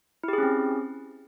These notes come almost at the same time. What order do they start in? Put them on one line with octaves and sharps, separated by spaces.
E4 G4 G#4 C#4 C4